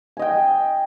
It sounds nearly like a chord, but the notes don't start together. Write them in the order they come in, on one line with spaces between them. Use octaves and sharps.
G#5 D#5 G5